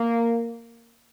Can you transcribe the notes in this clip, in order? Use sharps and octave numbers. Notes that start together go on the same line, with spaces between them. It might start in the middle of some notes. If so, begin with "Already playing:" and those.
Already playing: A#3